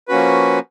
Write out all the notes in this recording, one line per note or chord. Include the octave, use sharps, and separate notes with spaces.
F3 A#3 C#4 F#4 B4